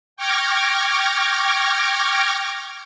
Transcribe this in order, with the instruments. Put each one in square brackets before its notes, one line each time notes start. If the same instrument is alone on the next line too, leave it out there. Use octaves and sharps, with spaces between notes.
[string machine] G5 C#6 D6 F6 G#6 A#6